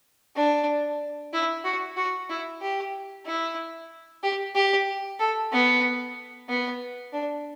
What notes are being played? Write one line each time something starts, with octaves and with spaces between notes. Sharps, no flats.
D4
E4
F#4
F#4
E4
G4
E4
G4
G4
A4
B3
B3
D4